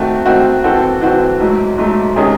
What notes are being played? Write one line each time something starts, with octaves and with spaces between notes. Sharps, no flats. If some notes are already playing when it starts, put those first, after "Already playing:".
Already playing: D#3 A3 C4 F#4
D#3 A3 C4 F#4
E3 C4 F#4 A4
E3 C4 F#4 A4
G#2 F#3 A3
G#2 F#3 A3
C3 D#3 G#3 C#4 G#4